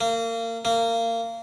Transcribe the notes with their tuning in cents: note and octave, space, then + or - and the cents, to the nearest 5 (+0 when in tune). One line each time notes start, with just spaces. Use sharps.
A#3 -30
A#3 -25